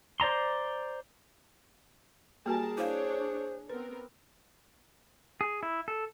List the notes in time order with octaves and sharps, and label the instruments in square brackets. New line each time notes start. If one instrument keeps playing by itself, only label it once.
[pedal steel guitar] C5 D5 A#5 C6
[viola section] G3 A#4 A5 [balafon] A#3 F#4 G#5 [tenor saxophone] G#4
[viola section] D4 C#5 [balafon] E4 F5 [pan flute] C5
[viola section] B3 C4 A#4 [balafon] B4
[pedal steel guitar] G#4
E4
A4